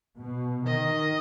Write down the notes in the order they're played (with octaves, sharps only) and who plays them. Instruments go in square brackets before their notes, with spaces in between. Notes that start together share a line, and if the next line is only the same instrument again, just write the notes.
[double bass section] B2
[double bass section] D#3 [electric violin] D#5